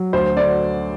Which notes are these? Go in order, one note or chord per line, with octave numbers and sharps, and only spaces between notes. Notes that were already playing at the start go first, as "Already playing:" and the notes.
Already playing: F#3
D2 C5
D3 D5